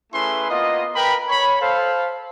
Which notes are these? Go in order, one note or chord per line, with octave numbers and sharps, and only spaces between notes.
A3 C#4 E4 G#4 B4 C6
A#3 B3 F4 D#5
A#4 B4 G5 B5
C#5 B5
A4 C5 F5